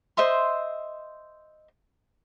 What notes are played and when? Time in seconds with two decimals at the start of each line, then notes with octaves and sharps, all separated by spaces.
0.17 C5 D#5 E5 C6